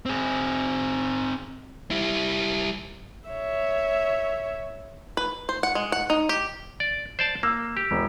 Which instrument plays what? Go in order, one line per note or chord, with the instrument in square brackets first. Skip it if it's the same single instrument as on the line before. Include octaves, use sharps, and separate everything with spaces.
[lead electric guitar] C4 G#4
G3 E4
[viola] C#5 E5
[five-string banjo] B4
C5
F#5
G#3
F#5
D#4
G4
[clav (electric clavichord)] D5
C5 D5 A5
[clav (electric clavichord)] A#3 [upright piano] E6
[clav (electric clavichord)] G4
[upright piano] E1